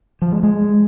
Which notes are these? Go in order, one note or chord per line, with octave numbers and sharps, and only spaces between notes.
F3
G#3
G#3